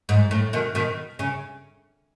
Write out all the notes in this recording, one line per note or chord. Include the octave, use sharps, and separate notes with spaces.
G#2
A2
B2 D#3
B2 D#3
C#3